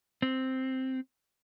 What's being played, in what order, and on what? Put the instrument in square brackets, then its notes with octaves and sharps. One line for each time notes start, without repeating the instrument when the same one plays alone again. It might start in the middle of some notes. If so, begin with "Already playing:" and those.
[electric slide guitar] C4